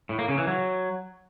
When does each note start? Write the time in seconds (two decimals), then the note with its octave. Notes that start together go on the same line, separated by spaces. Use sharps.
0.09 A2
0.19 A#3
0.28 C#3
0.38 E3
0.47 F#3